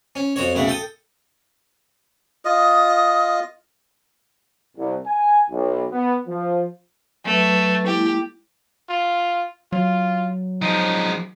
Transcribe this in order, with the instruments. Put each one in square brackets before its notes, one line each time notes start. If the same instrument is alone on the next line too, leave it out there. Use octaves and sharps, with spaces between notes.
[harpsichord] C#4
F2 F#4 C#5
B1 C#3 A3 F#5
A4 G5 D#6
[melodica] F4 D#5 [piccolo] D#6
[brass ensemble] C2
G#5
B1
B3
F3
[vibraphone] F#3 B4 [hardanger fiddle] A3
[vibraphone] G#3 A#3 E4 [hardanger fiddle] G4
[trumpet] F4
[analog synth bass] F#3 [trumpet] F4
[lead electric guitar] F3 G#3 [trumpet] D#4